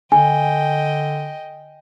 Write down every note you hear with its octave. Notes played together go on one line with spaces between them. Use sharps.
D3 D#5 G5 G#5